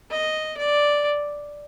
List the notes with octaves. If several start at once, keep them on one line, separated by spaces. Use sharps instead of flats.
D#5
D5